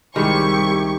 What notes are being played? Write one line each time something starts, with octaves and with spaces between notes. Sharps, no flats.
C2 D#3 G3 G#3 E4 G4 C#6